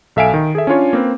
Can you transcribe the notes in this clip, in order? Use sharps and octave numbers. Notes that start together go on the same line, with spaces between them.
B1 A4 E5 F5 G#5 D7
D#3
G#4 A4 E5
C#4 D4 F4 C#5
A#3 C4 B4